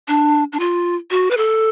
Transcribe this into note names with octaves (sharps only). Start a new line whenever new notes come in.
D4
D4
F4
F#4
B4
A4